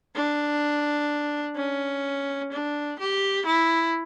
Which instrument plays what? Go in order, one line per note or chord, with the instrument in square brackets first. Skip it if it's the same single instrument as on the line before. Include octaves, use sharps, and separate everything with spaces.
[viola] D4
C#4
D4
G4
E4